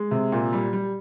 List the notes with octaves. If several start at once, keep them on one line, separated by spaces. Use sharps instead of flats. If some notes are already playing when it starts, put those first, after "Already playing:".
Already playing: G#3
C3
A#2
G3
G3